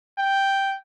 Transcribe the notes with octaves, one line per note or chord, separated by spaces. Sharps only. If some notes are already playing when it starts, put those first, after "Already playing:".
G5